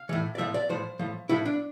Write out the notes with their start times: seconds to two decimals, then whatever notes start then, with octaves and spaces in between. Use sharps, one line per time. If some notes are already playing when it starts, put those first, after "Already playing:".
Already playing: F5
0.09 A2 E3
0.35 D5
0.38 A2 F3 E5
0.54 D5
0.69 A2 F3 C5
0.99 A2 F3
1.29 A2 F3 E4
1.45 D4